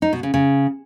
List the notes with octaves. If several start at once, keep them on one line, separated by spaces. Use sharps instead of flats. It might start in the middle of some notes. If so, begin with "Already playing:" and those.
D#4
B2
C#3
C#3